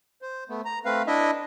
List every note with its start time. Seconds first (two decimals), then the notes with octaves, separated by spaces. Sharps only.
0.22 C5
0.49 A3 B3
0.65 A#5
0.85 A3 C4 B4 F5
1.07 D4 E4 D#5 E5